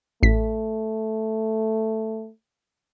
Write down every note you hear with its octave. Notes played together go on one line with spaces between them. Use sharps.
A1 A3 B6